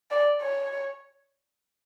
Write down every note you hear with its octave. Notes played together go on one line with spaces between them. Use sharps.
D5
C#5